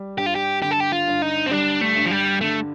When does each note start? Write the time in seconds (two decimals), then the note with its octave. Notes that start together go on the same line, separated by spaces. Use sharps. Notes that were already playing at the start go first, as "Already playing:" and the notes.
Already playing: G3
0.17 G2 G4
0.26 F4
0.35 G4
0.62 D3 G4
0.71 A4
0.80 G4
0.92 F4
1.08 G2
1.22 D#4
1.46 C4
1.51 G3 D4
1.81 A3
1.96 G2
2.06 F3
2.11 G3
2.41 D3 A3